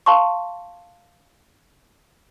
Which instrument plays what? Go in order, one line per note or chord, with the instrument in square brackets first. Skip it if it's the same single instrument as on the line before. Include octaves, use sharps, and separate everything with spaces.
[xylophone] F5 A5 C6 C#6